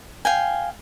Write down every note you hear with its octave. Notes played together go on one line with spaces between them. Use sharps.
F5 G5 G#5